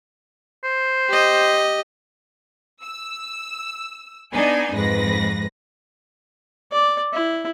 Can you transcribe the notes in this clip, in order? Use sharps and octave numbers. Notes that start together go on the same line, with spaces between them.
C5
G4 D#5
E6
B3 D4 D#4 G#5
F2 G#2 B4 A#6
D5
E4